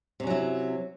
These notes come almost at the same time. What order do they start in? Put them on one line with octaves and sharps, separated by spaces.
C3 C#4 F#3 E4